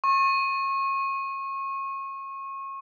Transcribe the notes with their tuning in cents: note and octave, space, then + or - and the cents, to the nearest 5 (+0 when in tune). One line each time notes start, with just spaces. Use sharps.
C#6 -30